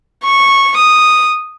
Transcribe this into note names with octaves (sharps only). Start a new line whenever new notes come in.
C#6
D#6